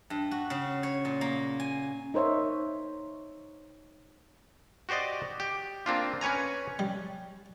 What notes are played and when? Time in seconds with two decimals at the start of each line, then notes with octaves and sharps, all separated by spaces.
0.10 G2
0.31 F#4
0.50 C#3
0.83 C#5
1.05 A#2
1.21 A#3
1.60 G#5
2.14 D#4 A#4 C5 C#5 E5
4.89 F#4 G4 C5 D5 D#5
5.40 G4
5.86 A#3 C4 D4 F4
6.21 C#4 B4 C#5 G#5 A#5
6.79 G3